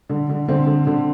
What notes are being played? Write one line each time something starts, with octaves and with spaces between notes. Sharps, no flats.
D3
D3
D3 C4
D3
D3